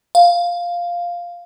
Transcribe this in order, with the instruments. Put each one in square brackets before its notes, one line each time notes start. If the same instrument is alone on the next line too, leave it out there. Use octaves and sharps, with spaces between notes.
[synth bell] F5